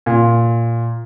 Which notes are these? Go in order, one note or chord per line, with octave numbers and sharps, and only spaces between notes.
A#2